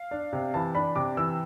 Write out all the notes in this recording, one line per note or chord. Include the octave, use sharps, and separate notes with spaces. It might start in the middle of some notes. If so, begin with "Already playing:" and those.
Already playing: F5
D4
C3
E3 A5
D4 B5
C3 D6
E3 E6